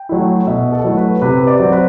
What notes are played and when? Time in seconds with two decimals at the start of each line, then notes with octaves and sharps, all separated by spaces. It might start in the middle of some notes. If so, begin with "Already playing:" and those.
Already playing: G5
0.09 F#3 A3 E4
0.47 B2 E5
0.72 A4
0.84 F#3 A3 E4
0.97 B4
1.22 C3 B4
1.47 D5
1.60 F#3 C4
1.72 B4